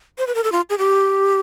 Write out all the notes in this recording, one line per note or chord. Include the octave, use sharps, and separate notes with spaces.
C5
B4
A#4
A4
F4
G#4
G4